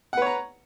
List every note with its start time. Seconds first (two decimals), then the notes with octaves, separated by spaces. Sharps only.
0.13 F#5
0.17 B4
0.22 C#5
0.26 A#5